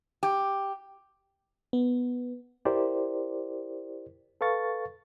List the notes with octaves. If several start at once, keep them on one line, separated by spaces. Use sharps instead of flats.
G4
B3
E4 G4 A#4 C5 D5
A4 B4 F5 C#6 A6